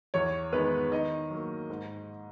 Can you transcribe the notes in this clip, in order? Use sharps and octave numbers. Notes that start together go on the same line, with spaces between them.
E2 C#5
D#3 G#3 B3 B4
D#3 D#5
F#3 A#3
G#2